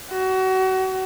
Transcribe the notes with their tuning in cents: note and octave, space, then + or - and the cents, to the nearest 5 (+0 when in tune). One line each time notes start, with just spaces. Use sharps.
F#4 +30